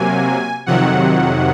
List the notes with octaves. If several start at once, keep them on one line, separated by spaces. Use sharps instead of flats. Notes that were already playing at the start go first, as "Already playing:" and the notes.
Already playing: C3 F#3 A#3 G#5
F2 C3 D#3 F#3 F#5